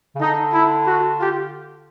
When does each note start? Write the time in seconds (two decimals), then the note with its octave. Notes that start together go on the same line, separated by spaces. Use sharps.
0.16 C#3
0.20 D3 D#4
0.53 E4
0.86 F#4
1.19 F4 G4